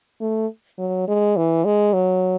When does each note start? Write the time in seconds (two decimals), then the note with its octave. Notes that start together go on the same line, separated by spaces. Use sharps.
0.21 A3
0.79 F#3
1.08 G#3
1.37 E3
1.65 G#3
1.94 F#3